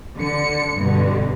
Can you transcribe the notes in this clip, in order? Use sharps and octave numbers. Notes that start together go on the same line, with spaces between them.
D3 C#7
G2 B2 D3